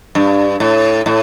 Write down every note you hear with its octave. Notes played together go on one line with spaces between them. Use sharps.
G2
A2
A2